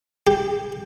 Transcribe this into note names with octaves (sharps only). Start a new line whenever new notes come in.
G4